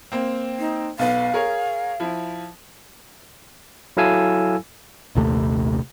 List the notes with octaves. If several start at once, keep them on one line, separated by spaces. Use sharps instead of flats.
A#3 C4
D#4
B1 B3 F5
G#4 A#4 C#5
F3 E4
F#3 E4 A4 F5 G#5 E6
A#1 D#2 C3 A3